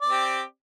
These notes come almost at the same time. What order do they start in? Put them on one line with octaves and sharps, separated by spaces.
D5 C4 G4